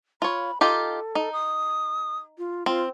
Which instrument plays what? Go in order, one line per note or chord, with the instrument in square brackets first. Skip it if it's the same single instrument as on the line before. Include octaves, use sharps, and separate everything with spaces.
[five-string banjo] F4 C#5 [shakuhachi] B5
[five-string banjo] D#4 F4 G4 [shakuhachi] A4
[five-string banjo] D#4
[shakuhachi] D#6
F4
[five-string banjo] C4 [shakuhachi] F4